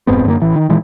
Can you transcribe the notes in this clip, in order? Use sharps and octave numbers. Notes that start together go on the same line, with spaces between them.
F1 G#2 B3 C4
F#2 D3 A3 A#3
A1 E3
D#3
A#2 D#3 E3 G#3